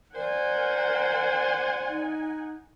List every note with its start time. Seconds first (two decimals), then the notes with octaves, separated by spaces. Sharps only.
0.15 A#4 C5 D5 F#5 G#5
1.89 D#4